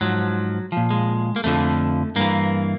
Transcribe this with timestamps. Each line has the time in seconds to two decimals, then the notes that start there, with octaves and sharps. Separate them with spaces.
0.01 G#2 F3 F#3
0.72 A#2 F3
0.91 G#3
1.36 A#3
1.44 F2 D3 F3 A3
2.16 G2 E3 A#3